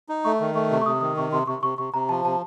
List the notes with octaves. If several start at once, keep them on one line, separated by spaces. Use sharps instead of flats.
D#4
A3 C#6
D#3
A3 C#6
C3
C#6
C3 D#6
D#3 D#6
C3 C#6
C3 C6
C3 C#6
C3 C#6
C3 C#6
C3 A#5
F3 A5
C3 A5